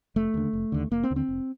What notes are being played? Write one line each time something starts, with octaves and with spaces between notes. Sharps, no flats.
F1 A3
D#2 D3
F1
D#2 D3
F1 A#3
C4
D#2 D3
C4
F1